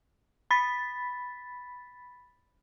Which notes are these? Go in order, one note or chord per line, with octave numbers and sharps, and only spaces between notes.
B5 A6 B6